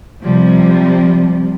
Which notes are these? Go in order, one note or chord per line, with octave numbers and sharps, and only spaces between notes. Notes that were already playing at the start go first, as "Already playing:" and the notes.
C3 F3 G3